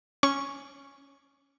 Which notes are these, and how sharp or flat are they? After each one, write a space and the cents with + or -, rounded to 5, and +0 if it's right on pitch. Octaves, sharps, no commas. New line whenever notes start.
C#4 +0 C#6 +0